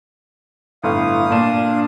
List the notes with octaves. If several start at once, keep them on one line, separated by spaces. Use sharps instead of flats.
G1 A2 F5 D#6
A#2 D4 E7